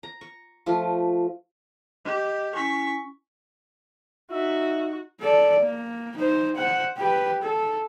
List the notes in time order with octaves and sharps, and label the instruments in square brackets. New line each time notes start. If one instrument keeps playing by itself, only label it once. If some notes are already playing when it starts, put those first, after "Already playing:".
[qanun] A#5
C#6
F3 A3 F4
[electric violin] G4 [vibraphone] D#5
[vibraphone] C#4 E4 G#5 [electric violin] C#6 B6
[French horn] D#4 [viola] F#4 [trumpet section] E5
[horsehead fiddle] A4 D5
A#3
D#4 C5
C5 F#5
G4 B4
A4